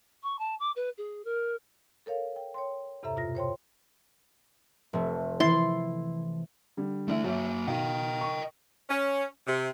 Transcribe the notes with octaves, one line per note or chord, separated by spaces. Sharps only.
C#6
A5
D6
B4
G#4
A#4
A4 A#4 C#5 F5
G5
C#5 G5 C6
E2 G2 C3 A4 E5 A#5
B2 F4 A#6
C5 C#5 G5 C6
F1 C3 A3
E3 E4 C6 A6
D3 G3
D3 E3 A3 D5 E5
F#3 A#3 F#4 E5
B2 D#3 D#5 F5 G5
C#6
C#4
C3